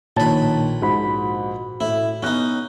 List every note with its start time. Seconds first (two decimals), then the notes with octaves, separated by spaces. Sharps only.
0.17 A#1 A#2 D#3 B4 C#5 A5
0.82 G#2 F#4 B5
1.81 A2 E4
2.23 B3 C#4 D#4 F#6